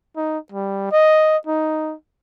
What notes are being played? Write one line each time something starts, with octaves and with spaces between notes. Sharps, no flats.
D#4
G3
D#5
D#4